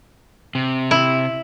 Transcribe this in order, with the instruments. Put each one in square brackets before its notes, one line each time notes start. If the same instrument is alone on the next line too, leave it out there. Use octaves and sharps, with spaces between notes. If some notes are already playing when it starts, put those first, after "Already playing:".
[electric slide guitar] C3
[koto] E4